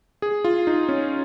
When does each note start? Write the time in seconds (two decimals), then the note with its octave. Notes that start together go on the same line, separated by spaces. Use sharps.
0.22 G#4
0.44 F4
0.67 D#4
0.89 C#4